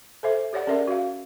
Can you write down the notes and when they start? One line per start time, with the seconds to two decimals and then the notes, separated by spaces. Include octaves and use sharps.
0.23 A4 C5 E5
0.53 G4 C#5 D5 F#5
0.67 C#4 G#4 A#4 D5 E5
0.87 F#4 F5